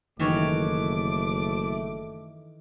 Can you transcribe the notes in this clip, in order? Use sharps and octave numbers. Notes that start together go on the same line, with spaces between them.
F#1 D#3 E3 A3 C#5 D6